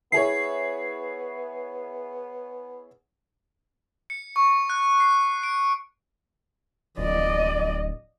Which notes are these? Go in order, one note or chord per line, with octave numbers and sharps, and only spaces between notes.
B3 E4 G#4 C#5 C7
C#7
C#6
F#6
C7
D7
D1 D5 D#5